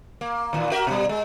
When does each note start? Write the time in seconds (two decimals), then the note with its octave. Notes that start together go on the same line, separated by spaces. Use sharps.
0.21 A#3
0.53 D#2 A#2 E3
0.71 F#4 A#4 E5
0.87 B2 G3
1.09 G#3